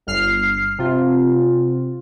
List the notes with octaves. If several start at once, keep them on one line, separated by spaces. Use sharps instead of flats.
G1 F6 C7
C3 F4